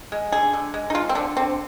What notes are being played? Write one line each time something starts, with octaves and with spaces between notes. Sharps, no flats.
G#3
D3 G#4
D3
G#3
D#4
G#3 F4
C4
D3 D4
D3 C4